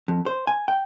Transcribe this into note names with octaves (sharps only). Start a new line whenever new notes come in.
F2
C5
G#5
G5